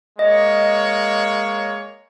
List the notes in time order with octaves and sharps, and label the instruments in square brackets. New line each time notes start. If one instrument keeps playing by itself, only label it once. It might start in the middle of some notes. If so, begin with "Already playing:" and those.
[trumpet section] G#3 A#3 C#5 [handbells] D#5